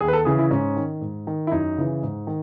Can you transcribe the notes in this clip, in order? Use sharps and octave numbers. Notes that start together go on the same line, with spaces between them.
D#2 G#4
B4
A4
C#3 E3 G#4
E4
G#2 C#4
D#3
G#2
D#3
E4
F#2 D#4
C#3 E3
G#2
D#3